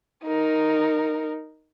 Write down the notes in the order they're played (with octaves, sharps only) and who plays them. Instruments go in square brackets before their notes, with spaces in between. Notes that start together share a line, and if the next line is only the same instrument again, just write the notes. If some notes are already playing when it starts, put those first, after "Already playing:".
[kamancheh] D#4 A#4